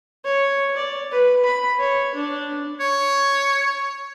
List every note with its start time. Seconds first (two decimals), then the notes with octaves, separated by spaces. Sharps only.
0.25 C#5
0.77 D5
1.11 B4
1.44 B5
1.79 C#5
2.14 D4
2.80 C#5